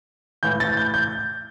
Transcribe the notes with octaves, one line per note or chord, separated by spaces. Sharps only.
A2 E3 G6
A6
G6
G6